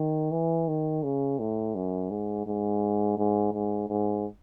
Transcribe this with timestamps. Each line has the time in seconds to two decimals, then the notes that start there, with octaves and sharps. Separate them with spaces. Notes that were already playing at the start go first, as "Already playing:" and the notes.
Already playing: D#3
0.31 E3
0.68 D#3
1.03 C#3
1.39 A2
1.75 F#2
2.11 G#2
2.46 G#2
3.18 G#2
3.53 G#2
3.88 G#2